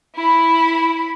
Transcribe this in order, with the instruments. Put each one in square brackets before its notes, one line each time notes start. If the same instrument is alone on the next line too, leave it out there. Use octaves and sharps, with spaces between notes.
[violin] E4 B5